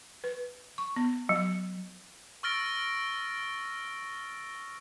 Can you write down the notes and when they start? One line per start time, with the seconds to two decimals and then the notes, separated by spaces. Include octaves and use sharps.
0.24 B4
0.78 C#6
0.96 B3
1.29 F#3
2.43 C#6 E6 F6 A6 A#6 D7